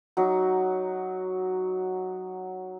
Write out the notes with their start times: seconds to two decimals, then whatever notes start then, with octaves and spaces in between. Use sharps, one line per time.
0.17 F#3 D#4